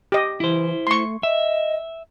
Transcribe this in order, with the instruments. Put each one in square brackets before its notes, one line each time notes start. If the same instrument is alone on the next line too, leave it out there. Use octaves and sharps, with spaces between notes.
[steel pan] G4 D#5
[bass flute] E3 [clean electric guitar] E4 C5
[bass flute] A3 [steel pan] C6 C#6
[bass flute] D#5 [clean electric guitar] E5